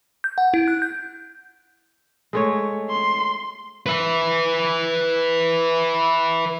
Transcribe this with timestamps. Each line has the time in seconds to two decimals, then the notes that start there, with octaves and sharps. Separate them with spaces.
0.24 G6
0.38 F#5
0.54 E4
0.68 F#6
0.82 G6
2.33 G#3 A3 C#5
2.90 C6
3.86 B4 E5